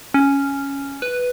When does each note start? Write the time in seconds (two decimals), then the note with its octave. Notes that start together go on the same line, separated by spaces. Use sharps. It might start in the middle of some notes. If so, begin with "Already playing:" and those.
0.14 C#4
1.02 B4